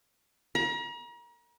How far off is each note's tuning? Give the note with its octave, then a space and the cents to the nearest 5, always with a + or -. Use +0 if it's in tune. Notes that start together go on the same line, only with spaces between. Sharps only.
A#5 +40